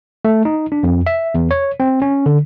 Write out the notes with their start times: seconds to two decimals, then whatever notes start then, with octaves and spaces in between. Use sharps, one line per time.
0.25 A3
0.45 D#4
0.72 D4
0.83 F2
1.07 E5
1.34 E2
1.51 C#5
1.80 C4
2.02 C#4
2.26 D3